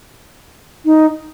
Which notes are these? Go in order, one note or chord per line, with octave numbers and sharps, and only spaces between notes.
D#4